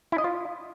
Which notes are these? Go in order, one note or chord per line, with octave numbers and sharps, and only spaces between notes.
E4
D#5
F4